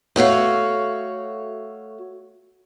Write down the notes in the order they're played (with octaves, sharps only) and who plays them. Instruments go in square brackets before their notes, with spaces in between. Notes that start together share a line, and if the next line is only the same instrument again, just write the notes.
[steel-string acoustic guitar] A3 F#4 C#5 F5